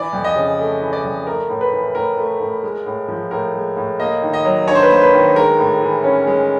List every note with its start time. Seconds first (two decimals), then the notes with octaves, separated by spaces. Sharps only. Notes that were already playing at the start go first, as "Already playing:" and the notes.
Already playing: E3 D5
0.13 F2
0.24 D#5
0.36 C#3
0.59 A3
0.81 E3
0.93 D5
1.04 F2
1.27 A3 A#4
1.49 A2
1.61 B4
1.72 E3
1.95 A2 A#4
2.17 A3
2.40 A2
2.63 G#3
2.86 A2
3.08 F3
3.31 A2 A#4
3.54 G#3
3.77 A2
3.99 A#3 D#5
4.22 D#3
4.33 D#5
4.45 F#3
4.67 D4 C#5
4.75 C5
4.83 B4
4.90 A#3 C5
5.02 B4
5.13 D#3
5.36 G#3 A#4
5.59 A2
5.81 E3
6.04 C#4
6.27 G#3